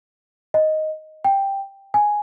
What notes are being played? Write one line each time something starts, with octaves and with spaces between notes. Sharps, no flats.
D#5
G5
G#5